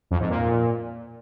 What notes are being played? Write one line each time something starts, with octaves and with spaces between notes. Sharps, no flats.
F2
G#2
A#2